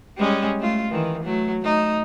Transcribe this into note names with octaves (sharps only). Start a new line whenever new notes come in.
G3 G#3 C#4
A3 F4
D#3 E3
F#3 A3
A3 D#4